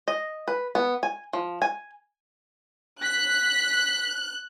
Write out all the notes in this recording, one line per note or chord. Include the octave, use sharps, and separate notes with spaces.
D#5
B4
B3
G#5
F3
G#5
F#6 B6